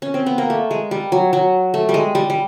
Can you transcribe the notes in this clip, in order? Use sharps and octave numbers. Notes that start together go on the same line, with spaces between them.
C#4
C4
B3
A#3
A3
G#3
G3
F#3
F#3
A3
G3
G#3
G3
G3